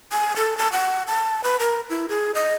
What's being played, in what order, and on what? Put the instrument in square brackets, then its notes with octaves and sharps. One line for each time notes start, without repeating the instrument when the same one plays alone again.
[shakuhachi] G#5
A4
A5
F#5
A5
B4
A#4
E4
G#4
D#5